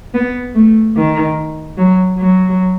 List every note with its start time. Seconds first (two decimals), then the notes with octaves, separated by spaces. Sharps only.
0.14 B3
0.55 A3
0.96 D#3
1.77 F#3
2.18 F#3